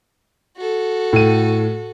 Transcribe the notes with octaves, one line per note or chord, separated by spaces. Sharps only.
F#4 A4
A2 D#7